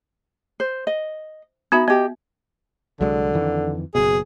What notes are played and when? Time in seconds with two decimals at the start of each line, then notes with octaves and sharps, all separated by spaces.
0.60 C5
0.87 D#5
1.72 B3 D#4 F#4 E5 B5
1.88 B3 G4 D#5
3.00 C2 D3 F#3 G#3
3.34 F2 D#3 E3
3.95 F#1 B2 G#4